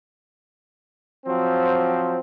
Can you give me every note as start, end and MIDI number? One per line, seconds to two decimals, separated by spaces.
1.26 2.20 53
1.26 2.20 54
1.26 2.20 60